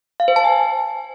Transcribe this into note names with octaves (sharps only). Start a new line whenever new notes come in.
F5
C5
A5
G#5